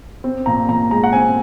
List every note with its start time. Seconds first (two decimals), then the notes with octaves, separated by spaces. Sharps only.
0.24 C4
0.46 A#2 A#5
0.68 A#2 A#5
0.91 G#3 A#5
1.04 F#5
1.13 C4 G#5